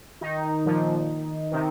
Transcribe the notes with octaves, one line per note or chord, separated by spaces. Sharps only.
D#3 D#4
A#2 F3
C3 D#3